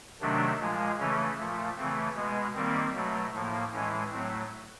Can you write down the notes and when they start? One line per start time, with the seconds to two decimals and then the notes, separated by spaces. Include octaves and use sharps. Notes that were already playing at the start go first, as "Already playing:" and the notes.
0.21 C3 D#3 F#3 A3 D4
0.60 A#2 F3 G#3
0.99 C#3 E3 A3 C#4
1.38 A#2 F3 A3
1.77 C#3 E3 A3 C4
2.16 B2 G#3 B3
2.55 D#3 G3 A#3 C4
2.94 B2 F#3 A3
3.33 A2 F3 A#3
3.72 A2 E3 G#3 C#4
4.11 A2 F#3 A3 C4